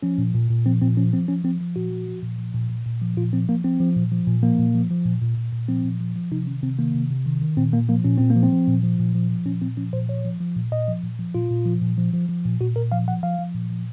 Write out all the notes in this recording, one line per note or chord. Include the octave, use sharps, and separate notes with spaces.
F3 C#4
A#2
A#2
A#2
F3 C4
A#2 C4
F3 C#4
F3 C4
F3 C#4
F3 C4
F3
A#2 F#4
F3
F3
A#2
F3
A#2
A#2
A#2
F3
A#2 F4
F3 C4
F3 A#3
F3 C4
F3
A#2
F3
A#2
F3 A#3
A#2
F3
F3
A#2
A#2
A#2
A#2
F3 C4
A#2
F3
F3
C3 D#4
D#3 C#4
C3 C4
D#3 A#3
C3
C3
D#3
D#3
A#2 C4
A#2 A#3
F3 A#3
A#2 C#4
A#2 C4
A#3
F3
C4
F3
A#2
F3
A#2
F3
F3
A#2 C#4
A#2 C4
F3 C#4
A#2 C5
F3 C#5
F3
F3
A#2
A#2 D#5
F3
A#2
F3
A#2 F4
A#2
F3
A#2
F3
F3
F3
A#2
A#2 F#4
A#2 A#4
F3 F5
F3 F#5
F3 F5
F3
A#2
F3